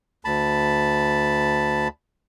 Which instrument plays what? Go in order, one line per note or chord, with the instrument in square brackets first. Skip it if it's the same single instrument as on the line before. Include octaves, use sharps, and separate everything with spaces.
[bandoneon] D2 A5 B5